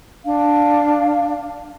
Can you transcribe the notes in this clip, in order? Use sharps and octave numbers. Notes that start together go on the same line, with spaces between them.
D4 F5